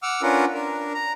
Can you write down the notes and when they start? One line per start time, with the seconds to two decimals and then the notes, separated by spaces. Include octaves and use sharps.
0.03 F#5 D6 E6 F6
0.22 C#4 D4 F4 A#4 B4 F#5
0.54 D4 A#4
0.94 A#5